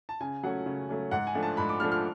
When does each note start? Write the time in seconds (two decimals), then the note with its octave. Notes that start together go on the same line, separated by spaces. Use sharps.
0.09 A5
0.20 C#3 G#5
0.43 F#3 A3 C#4 F#5
0.66 C#3
0.89 F#3 A3 C#4
1.11 G#2 F#5
1.27 G#5
1.34 F3 A3 D4
1.43 A5
1.57 G#2 B5
1.69 D6
1.80 F3 A3 D4 F6
1.92 F6